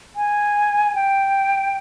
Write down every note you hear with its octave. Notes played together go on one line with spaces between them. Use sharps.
G#5
G5